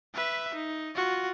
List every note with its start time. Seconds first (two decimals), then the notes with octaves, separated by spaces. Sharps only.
0.15 B4 E5
0.54 D#4
0.96 F4 F#4